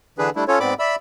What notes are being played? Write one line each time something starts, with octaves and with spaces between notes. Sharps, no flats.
D3 E3 D4 G#4 B4
G3 A3 D4 E4
C#4 F4 A4 C#5
G#2 B3 C4 D5 B5 D6
D5 E5 B5 E6